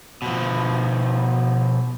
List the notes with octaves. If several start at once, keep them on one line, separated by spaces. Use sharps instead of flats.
B2 F3